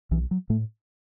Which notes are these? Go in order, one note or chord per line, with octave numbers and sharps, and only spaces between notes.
B1 E3
F#3
A2 A3